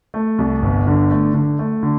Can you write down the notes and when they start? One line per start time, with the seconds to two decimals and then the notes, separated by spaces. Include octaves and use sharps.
0.14 A3
0.38 C2
0.62 G1
0.87 D3
1.11 A3
1.34 D3
1.59 A3
1.83 D3